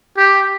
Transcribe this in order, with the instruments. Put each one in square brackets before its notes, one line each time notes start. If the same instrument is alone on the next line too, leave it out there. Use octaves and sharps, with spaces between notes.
[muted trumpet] G4